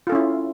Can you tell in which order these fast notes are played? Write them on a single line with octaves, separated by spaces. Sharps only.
F4 A4 C#4 E4